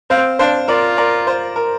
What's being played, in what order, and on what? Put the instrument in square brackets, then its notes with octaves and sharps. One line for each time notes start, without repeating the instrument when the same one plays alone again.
[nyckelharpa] C4 [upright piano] C5 F5
[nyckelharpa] D4 [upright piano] C5 F5
[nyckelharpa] F4 [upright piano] A#4 D5
[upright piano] A#4 D5
C5
A#4